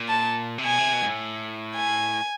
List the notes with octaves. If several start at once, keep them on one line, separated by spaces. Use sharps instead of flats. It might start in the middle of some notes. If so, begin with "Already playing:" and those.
Already playing: A#2
A5
C3
B2 G#5
C3
B2
G#2
A2
G#5